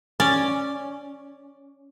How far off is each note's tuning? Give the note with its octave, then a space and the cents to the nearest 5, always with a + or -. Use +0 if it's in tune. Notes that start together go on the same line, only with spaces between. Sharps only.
C#4 +0 D5 +0